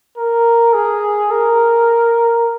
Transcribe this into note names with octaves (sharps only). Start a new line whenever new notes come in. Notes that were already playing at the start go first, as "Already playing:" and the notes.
A#4
G#4
A#4